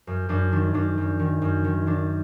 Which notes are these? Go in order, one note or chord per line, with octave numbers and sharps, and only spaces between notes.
F#2
F#2 D4
D#3 D4
F#2 D4
F#2
D#3
F#2
D#3
D#3 D4